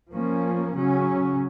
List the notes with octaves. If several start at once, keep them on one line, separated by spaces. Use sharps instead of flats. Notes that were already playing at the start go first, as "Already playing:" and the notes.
F3 A#3 C#4
C#3 F#3 C#4